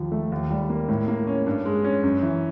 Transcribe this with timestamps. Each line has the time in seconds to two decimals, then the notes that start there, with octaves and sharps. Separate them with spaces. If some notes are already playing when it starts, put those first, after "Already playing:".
Already playing: D#2 F3
0.12 A3
0.32 D#2
0.51 G3
0.70 A#3
0.89 A2
1.08 A#3
1.27 C#4
1.46 G2
1.65 G#3
1.84 C#4
2.04 F#2
2.23 E3